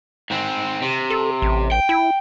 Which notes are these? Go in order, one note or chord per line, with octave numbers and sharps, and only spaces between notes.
G#2 C4
C3
A4
A1
G5
E4